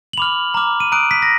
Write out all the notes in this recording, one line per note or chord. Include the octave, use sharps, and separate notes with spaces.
F#7
B5 D6 F6 F7
A#5 D6 F6
D#7
A#5 D#6 F#6 D7
B6
A#6